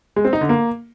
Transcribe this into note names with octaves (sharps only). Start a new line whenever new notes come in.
G#3
C4
D#4
D3
A#3